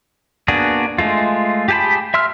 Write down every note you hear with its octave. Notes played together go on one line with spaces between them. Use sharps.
A#3 B3 D4 F#4 G#4
G#3 A3 F4
G4 G#4 G5 A5 B5
E5 C6 E6 F6